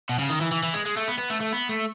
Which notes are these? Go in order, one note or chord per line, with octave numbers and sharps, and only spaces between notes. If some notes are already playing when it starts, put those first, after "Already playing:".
B2
C#3
D#3
E3
E3
E3
G#3
G#3
A3
B3
B3
A3
A3
B3
A3